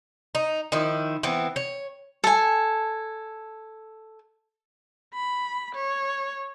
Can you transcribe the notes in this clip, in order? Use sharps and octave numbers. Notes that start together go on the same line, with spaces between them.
D#4
D#3 F3 E4
E3 B3 C4
C#5
A4 G#5
B5
C#5